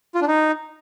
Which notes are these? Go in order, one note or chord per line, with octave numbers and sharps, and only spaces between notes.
F4
D4
D#4